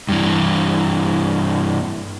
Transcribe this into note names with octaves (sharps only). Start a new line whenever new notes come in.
G2 E3